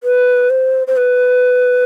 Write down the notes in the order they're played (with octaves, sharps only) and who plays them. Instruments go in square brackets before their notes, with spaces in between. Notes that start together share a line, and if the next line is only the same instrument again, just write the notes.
[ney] B4
C5
C5
B4